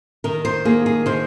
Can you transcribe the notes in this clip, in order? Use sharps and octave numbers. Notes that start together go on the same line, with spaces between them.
D#3 A#4
C5
A#3 G#4
G#4
D#3 C5